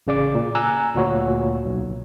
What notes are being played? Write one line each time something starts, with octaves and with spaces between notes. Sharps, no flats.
A1 C#3 D5 D6
A#2
G#5 A#5 E6 F#6
D2 A#2 F#4 C#5
B1